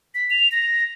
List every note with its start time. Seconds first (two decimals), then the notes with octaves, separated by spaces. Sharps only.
0.15 B6
0.31 F7
0.52 A#6